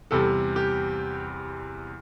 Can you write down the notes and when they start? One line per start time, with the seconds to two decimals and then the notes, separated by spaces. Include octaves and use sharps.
0.11 E2 C3 G3 A4
0.56 G4